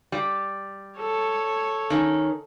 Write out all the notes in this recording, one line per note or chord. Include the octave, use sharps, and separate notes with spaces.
G3
A4 C#5
D#3 C#4